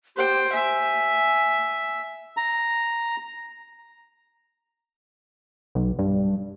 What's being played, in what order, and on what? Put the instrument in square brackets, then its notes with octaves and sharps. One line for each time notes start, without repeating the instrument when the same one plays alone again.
[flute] G4 [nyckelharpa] C5 G5
[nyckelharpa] E5 [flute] G#5
[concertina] A#5
[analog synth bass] B1
G2